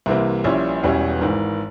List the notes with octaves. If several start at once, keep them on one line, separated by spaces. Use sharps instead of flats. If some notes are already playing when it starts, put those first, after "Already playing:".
C2 C3 E3 A#3
A#1 A#2 G3 C#4 E4
E1 E2 E3 G3 C#4
G#1 G#2 E3